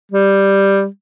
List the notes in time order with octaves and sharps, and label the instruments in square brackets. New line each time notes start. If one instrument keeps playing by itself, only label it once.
[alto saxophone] G3